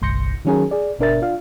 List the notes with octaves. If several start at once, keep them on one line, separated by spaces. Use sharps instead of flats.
G1 C2 C6 G6 A#6 C#7
D#3 F#3 C#4 F#4 G#4 A#4
G#4 D5
G1 B2 D4 A#4 E5 A6
D4 F4 F5